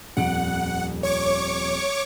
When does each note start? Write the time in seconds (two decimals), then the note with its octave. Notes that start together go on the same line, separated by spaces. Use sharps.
0.17 D#1 F2 F#5 D7
1.03 C#5 C#6 D6